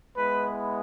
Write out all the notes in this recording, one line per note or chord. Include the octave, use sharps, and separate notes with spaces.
G#3 B3 E4 B4